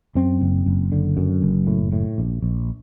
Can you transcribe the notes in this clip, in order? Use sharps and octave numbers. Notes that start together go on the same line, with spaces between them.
F#2 C4
F#1
F#1
D3
F#2
F#1
A2
A2
A#1
A#1